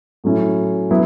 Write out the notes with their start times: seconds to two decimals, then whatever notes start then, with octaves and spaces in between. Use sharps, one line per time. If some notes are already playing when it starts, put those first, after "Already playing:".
0.24 A2 F#3 C#4 E4
0.91 F#3 B3 E4